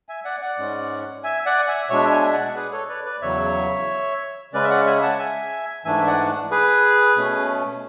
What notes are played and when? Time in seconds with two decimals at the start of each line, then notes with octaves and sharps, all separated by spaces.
0.09 E5 G#5
0.25 D5 F#5
0.41 D5 F#5
0.58 G#2 G#3 C#4
1.24 E5 G#5
1.46 D5 F#5
1.68 E5 G#5
1.89 B2 G#3 D4 C#5 E5
2.12 E5 G#5
2.33 D5 F#5
2.56 G#4 B4
2.72 A4 C#5
2.89 B4 D5
3.05 B4 D5
3.21 E2 C#3 F#3 C#5 E5
4.53 C#3 G#3 C#4 B4 D5
4.64 E5
4.70 D5 F#5
4.86 E5 G#5
5.03 F#5 A5
5.19 E5 G#5
5.85 G#2 E3 A3 D4 E5 G#5
6.07 D5 F#5
6.51 G#4 B4
7.17 B2 A3 C#4